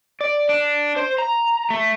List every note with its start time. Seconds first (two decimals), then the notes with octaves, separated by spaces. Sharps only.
0.21 D5
0.49 D4
0.96 C5
1.18 A#5
1.70 A3